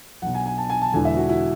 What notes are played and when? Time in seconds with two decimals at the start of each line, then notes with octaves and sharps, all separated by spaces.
0.22 B1 B2 F#5
0.35 G#5
0.46 G#5
0.58 A5
0.70 G#5
0.82 A5
0.93 E1 E2 D3 G#5
1.05 E5
1.17 F#4
1.29 E4